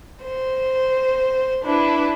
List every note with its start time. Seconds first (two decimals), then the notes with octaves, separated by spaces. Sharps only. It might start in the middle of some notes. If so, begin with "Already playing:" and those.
0.24 C5
1.63 D4 E4 B4